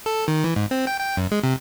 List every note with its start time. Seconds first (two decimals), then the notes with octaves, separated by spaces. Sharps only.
0.06 A4
0.28 D#3
0.44 E3
0.56 G#2
0.71 C4
0.87 G5
0.99 G5
1.17 F#2
1.31 G#3
1.43 C3